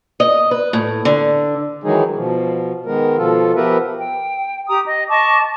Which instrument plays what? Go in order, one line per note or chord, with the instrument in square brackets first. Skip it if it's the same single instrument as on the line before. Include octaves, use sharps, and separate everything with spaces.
[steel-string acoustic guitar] D#5
B4
A2
D3
[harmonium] D#3 E3 F#3 G#3 D#4 G#4
B2 F3
D#3 G#3 B3 A#4
B2 F3 F4 A4
F3 B3 G4 A#4 B4 E5
[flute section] G5
G4 A#5 D#6
D#5
D#5 A5 C#6 D6